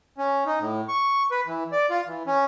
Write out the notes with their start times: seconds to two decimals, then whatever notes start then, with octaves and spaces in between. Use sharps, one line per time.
0.18 C#4
0.46 D#4
0.59 A2
0.89 C#6
1.31 B4
1.46 E3
1.72 D5
1.90 F4
2.07 E3
2.27 C#4